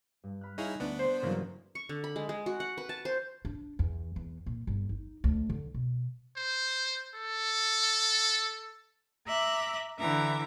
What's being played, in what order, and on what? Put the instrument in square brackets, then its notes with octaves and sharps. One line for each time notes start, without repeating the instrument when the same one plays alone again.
[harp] G2
B5 F6 F#6
[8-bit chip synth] D#4 E4 G#4 [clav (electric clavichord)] C#5 F5 A#5
[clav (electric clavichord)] D2 [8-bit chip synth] B3 D4
[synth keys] C5
[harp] G2 E3 F#3 [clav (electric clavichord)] C#3 A#3
[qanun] C#6
D3
B5
G#3
G#3
F#4
F#5
B4
A5
C5
[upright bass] D4
E2
E2
A#2
G1
D#4
D2
D3
B2
[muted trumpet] C5
A4
[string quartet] E5 A#5 D6 F#6
D3 E3 E5 A#5 D6